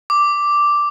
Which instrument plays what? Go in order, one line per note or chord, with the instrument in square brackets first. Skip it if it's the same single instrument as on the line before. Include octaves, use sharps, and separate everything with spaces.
[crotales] D6